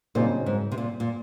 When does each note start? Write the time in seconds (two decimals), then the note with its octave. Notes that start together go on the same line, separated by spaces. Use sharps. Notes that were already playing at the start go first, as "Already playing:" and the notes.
0.15 A#2 C#3 F#3 C4 D#4 A#4
0.46 G#2
0.72 C3
0.78 A#2
1.00 A#2